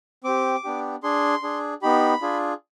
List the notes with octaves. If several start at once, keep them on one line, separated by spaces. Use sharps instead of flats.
C4 G4 D6
B3 D4 G4
D4 G#4 C6
D4 G#4
B3 D#4 G4 B5
D4 F4 G#4